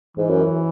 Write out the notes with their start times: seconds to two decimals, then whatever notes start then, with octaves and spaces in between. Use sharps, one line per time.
0.17 G#2 E3
0.30 F#2